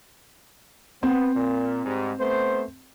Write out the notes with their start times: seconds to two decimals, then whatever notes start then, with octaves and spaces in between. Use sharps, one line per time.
1.03 B3 C4
1.35 A#2
1.86 G#2 G3
2.20 A3 B3 C5